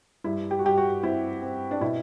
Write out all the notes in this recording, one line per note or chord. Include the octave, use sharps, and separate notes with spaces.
G2 E4
G4
F#4
G2 G4
F#4
C4 E4
C4
D4
B2 E4